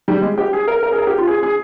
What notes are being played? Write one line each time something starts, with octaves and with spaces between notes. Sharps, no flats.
G3
G#3
G4
G#4
A#4
A#4
G#4
A#4
G4
F4
G#4
G#4